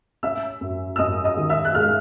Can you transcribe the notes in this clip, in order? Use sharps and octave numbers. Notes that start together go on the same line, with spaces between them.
C#4 E5 E6
F#2
E6
F#2 D#5 D#6
D#5 D#6
D#3
E5 E6
F#6
G#3 F5 F6